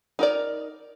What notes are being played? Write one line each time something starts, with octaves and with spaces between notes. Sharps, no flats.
D#4 A#4 D5